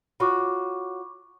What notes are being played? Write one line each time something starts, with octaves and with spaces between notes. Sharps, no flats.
F4 F#4 C#5 B5 C#6 D6